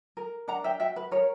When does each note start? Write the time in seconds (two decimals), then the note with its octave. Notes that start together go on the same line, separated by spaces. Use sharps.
0.17 A#4
0.48 D4 F#5 A#5
0.64 E5 G5
0.80 F#4 E5 G5
0.96 B4
1.11 A#4 C#5